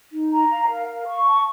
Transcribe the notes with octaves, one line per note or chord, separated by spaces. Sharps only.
D#4
A#5
F5
A#4
F5
C#6
A5